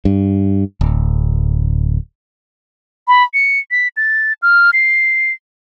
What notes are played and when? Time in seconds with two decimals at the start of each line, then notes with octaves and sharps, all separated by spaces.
0.05 G2
0.81 D1
3.08 B5
3.34 C#7
3.71 B6
3.97 A6
4.42 F6
4.73 C7